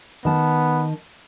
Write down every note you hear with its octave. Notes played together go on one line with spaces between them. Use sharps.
D#3 B3 A5